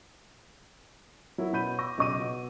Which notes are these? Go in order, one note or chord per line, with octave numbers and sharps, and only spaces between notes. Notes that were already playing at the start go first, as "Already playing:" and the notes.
F#3 E4 A#4
B2 C#4 B5 G6 D#7
C#6 D6 E6 A#6
B1 C#3 D#5 D6 A#6 D#7
B2